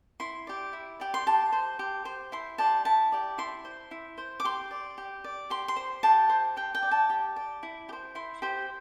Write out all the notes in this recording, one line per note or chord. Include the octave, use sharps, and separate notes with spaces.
E4 C6
G4 D5
E4
G4 D5
C6
G4 A5
C5
G4
C5
E4 C6
G4 D5 A5
E4 A5
G4 D5
E4 C6
C5
E4
C5
D6
G4 C6
D5
G4
D5
G4 C6
C6
C5
G4 A5
C5
G4 G5
G5
D5
A5
G4
D5
E4
G4
C5
E4 C6
G4 C5